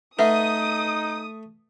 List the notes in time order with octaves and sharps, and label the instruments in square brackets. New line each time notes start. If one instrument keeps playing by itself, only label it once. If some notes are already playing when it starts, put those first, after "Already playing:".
[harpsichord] A3 [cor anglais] D#4 [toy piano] B4 E5 F#5 [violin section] D#6